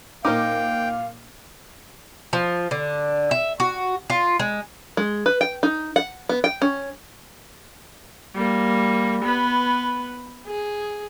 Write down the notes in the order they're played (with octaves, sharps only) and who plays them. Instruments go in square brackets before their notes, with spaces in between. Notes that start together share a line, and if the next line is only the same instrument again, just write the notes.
[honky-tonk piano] A#2 D6 [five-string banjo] D#4 A#4 C5 [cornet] F5 [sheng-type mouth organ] G5
[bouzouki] F3
D3
E5
F#4
F4
G#3
[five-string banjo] G#3
B4
G5
D#4
F#5
B3
G5
C#4
[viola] G3 A#3
B3 B4
G#4